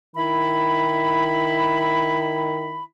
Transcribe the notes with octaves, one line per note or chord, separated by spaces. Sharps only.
D#3 E4 B5